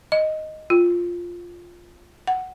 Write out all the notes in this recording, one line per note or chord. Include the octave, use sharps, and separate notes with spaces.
D#5
F4
F#5